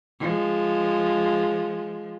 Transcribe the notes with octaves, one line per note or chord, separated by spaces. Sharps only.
F3 G#3